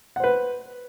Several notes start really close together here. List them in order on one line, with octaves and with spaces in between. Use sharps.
F#5 C5 B4